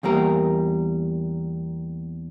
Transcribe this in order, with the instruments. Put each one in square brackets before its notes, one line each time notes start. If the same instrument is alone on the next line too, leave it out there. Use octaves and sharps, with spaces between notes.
[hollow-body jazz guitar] E2 G3 A#3 A#4